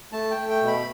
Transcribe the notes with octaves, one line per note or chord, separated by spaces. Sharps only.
A3 A5
G5
A3
G5
B2
B5